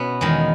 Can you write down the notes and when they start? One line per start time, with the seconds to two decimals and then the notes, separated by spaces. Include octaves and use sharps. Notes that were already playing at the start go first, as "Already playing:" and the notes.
Already playing: B2 B3 C#4 E4
0.21 E2 D#3 G#3